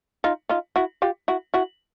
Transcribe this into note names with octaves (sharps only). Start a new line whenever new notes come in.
D#4 F4
D#4 F4
E4 F#4
F4 G4
E4 F#4
E4 F#4